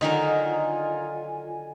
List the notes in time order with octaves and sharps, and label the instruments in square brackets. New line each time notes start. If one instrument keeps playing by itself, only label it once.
[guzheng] D3 D#3 F#3 [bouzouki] D#4 A#4 [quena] F4 [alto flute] G#5